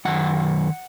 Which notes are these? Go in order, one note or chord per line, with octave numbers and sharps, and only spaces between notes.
F#2 D#3 F#5